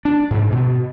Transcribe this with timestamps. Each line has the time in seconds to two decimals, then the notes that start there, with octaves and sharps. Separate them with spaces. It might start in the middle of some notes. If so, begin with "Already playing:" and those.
0.05 D4
0.31 G#2
0.52 B2